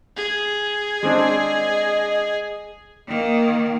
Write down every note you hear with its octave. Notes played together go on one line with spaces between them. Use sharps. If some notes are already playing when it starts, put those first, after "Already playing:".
G#4
G#3 C4 D4 D#5
D#3 A#3